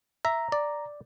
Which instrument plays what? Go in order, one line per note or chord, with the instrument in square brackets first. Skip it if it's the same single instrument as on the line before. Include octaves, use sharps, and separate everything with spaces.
[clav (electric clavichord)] E5 [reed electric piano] A#5
[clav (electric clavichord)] D5